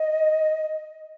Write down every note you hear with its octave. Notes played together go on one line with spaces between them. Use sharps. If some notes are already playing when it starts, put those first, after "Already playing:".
Already playing: D#5